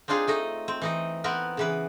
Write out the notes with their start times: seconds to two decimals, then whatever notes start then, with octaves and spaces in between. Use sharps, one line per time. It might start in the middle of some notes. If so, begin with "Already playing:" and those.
0.08 C4 D4 D#4 F4 G#4
0.28 A3 D#4 D#5
0.68 C4
0.82 E3 D#4 D#5
1.24 B3 C4 A#4 B4
1.57 C#3 E3 B4